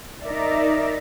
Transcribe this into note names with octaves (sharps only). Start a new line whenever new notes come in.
D#4 A#4 D5 E5